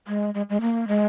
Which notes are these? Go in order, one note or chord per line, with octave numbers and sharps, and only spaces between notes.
G#3
G#3
G#3
A#3
G#3